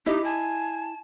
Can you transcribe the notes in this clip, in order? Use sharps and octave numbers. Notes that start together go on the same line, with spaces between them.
D#4 E4 G4 D#5
G#5 A5